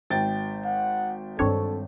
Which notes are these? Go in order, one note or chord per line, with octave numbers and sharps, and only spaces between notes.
G#1 G5 A6
F#5
G2 D#3 C4 D4 A4 C#5